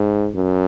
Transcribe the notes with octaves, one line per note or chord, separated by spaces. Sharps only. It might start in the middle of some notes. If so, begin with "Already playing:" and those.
Already playing: G#2
F#2